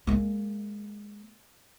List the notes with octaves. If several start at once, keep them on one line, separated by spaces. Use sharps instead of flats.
G#3 A#3